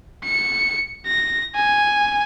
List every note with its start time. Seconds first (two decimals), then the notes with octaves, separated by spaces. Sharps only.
0.25 C#7
1.07 A#6
1.56 G#5